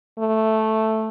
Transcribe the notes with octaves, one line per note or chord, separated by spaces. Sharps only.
A3